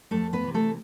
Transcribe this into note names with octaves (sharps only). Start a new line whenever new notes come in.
F2 A3 A4
B3 B4
C3 E3
A3 A4